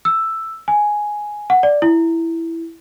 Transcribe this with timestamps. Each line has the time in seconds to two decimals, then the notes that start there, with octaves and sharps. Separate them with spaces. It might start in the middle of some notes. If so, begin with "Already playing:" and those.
0.05 E6
0.68 G#5
1.50 F#5
1.63 D5
1.82 E4